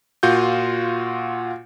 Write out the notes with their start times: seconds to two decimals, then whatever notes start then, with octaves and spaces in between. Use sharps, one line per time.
0.23 A#2 F4 F#4 G6